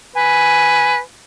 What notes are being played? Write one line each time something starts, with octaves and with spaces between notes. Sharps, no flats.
B4 G#5